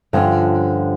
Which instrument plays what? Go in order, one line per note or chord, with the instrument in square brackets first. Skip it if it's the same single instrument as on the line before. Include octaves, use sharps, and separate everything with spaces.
[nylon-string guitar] G2 D3 F3 C#4 F4